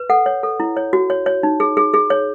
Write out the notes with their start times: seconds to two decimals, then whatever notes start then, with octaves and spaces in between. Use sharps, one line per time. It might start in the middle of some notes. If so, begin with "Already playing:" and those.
Already playing: B4
0.10 A4 F#5
0.26 C#5
0.43 A4
0.60 E4
0.77 C#5
0.93 F#4
1.10 C#5
1.26 C#5
1.43 D#4
1.60 G#4
1.77 G#4
1.94 G#4
2.10 C#5